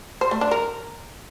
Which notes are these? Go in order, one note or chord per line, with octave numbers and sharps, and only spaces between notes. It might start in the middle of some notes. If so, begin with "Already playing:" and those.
C5
A3
D4
A#4